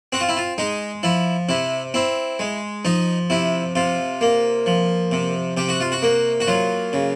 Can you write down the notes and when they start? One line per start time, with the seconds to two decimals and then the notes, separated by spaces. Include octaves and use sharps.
0.12 C4 F#4
0.21 F4
0.29 E4
0.37 F4
0.58 G#3 D#4
1.03 F3 E4
1.49 C3 E4
1.94 C4 E4
2.39 G#3
2.85 F3 D#4
3.30 C3 E4
3.75 C3 F4
4.21 A#3
4.66 F3
5.12 C3
5.57 C3 G4
5.69 F#4
5.80 F4
5.92 F#4
6.02 A#3
6.40 F#4
6.48 F#3 F4
6.93 C#3